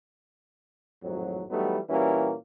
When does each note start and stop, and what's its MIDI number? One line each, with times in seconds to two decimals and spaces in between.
1.04 1.44 32
1.04 1.44 41
1.04 1.44 45
1.04 1.44 54
1.50 1.79 52
1.50 1.79 54
1.50 1.79 55
1.50 1.79 57
1.50 1.79 59
1.50 1.79 63
1.90 2.34 46
1.90 2.34 52
1.90 2.34 55
1.90 2.34 58
1.90 2.34 61
1.90 2.34 66